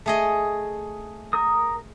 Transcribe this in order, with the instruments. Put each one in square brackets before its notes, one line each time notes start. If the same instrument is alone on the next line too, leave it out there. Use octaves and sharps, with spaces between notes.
[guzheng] A3 G#4 D#5
[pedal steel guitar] A#4 D#6